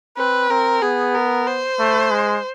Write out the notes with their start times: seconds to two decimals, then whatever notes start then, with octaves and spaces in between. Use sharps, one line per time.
0.17 C4 B4
0.50 C4 A#4
0.82 B3 G#4
1.14 A#4
1.47 C5
1.79 A3
2.11 G#3